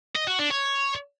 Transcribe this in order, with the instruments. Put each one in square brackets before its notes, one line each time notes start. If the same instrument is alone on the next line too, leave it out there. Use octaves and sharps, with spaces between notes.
[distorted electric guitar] D#5
F#4
D4
C#5